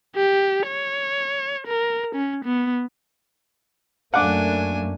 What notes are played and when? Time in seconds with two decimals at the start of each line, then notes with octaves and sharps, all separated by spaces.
0.16 G4
0.67 C#5
1.67 A#4
2.15 C#4
2.45 B3
4.14 F#2 A3 A#3 D4 F#5 G#5 D6